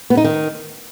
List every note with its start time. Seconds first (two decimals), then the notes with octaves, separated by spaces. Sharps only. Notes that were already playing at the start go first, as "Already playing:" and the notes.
0.10 B3
0.17 D#4
0.24 D#3